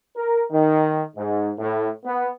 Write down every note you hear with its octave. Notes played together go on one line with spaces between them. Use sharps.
A#4
D#3
G#2
A2
B3